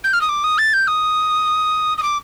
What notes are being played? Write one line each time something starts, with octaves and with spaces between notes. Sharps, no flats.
G6
F6
D#6
D6
D#6
A6
G6
D#6
D#6
D6